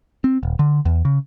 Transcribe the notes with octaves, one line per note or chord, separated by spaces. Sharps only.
C4
D#1
D3
E2
C#3